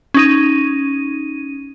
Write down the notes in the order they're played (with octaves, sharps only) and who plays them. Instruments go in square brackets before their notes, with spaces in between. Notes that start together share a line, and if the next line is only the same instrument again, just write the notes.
[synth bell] C#4 D#4 D#7